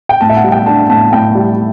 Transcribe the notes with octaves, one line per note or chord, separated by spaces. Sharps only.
G5
A2 A5
E5
F#5
G3
G5
D4 A5
A2 A5
A2 G5
G3